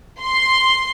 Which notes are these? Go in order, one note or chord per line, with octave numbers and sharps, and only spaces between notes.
C6